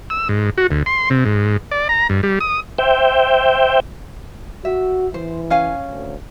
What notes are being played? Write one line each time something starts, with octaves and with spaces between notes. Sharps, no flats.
E6
G#2
F#4
D2
C6
C3
G#2
D5
A#5
G2
G3
D#6
C5 E5 G5
F#4 E5
E3 C5
C#4 F5 G#5
D2